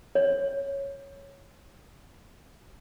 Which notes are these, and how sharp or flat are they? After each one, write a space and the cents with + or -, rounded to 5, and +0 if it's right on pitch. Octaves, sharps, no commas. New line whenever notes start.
C#5 -5